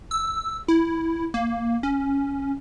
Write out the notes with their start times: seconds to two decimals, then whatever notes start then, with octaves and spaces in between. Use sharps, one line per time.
0.11 E6
0.68 E4
1.34 A#3
1.83 C#4